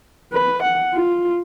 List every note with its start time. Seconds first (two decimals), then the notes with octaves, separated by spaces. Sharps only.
0.33 B4
0.63 F#5
0.94 F4